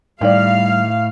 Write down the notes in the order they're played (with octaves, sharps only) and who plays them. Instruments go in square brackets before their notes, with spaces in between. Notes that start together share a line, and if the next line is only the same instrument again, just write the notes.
[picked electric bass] A2 [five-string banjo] D#3 D5 [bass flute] G3 [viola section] F5